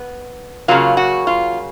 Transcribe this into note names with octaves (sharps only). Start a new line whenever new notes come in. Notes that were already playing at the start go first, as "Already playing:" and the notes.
Already playing: B3
C#3 F#3 A#3 F4
F#4
F4